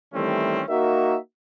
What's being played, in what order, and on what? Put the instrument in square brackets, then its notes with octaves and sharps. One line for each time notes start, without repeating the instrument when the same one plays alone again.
[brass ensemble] D#3 E3 G3 A3 C4 C#4
A#3 D#4 F#4 A#4 E5